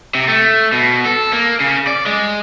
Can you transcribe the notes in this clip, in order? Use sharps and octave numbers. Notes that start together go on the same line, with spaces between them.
C3
A3
B2
A4
A#3
C#3
D5
G#3